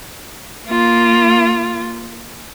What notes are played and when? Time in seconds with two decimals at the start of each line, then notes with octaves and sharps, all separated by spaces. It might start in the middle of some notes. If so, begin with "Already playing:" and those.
0.68 A#3 F4